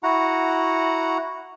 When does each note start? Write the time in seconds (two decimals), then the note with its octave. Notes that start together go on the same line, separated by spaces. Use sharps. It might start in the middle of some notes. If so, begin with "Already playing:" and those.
0.03 E4 F#4 F#5 A#5